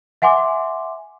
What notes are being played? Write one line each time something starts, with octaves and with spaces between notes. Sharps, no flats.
E5 F#5 G#5 C6 D6